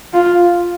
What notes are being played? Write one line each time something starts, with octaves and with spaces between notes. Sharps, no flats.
F4